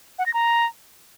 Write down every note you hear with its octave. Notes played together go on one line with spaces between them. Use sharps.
F#5
A#6
A#5